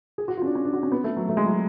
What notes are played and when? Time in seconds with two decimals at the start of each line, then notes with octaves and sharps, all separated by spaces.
0.18 G#4
0.28 F#4
0.37 F4
0.42 C#4
0.46 D4
0.55 C#4
0.65 D4
0.73 F#4
0.83 C#4
0.92 B3
1.04 A3
1.17 F#3
1.29 A3
1.37 G#3
1.46 F#3